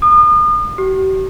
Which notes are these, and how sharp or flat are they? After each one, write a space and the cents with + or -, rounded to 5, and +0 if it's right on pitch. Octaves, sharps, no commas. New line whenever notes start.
D#6 -40
G4 -45